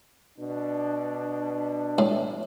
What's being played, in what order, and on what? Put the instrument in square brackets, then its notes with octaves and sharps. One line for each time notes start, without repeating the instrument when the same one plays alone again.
[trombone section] B2 D4
[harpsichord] A2